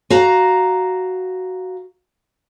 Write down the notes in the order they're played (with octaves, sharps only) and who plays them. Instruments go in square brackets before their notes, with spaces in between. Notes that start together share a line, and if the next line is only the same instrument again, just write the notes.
[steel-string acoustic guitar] F#4 F5 A#5